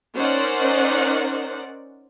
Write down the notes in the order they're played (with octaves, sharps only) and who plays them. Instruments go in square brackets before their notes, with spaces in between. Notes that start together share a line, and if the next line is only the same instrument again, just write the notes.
[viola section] C#4 D#4 A#4 C5 D5 F#5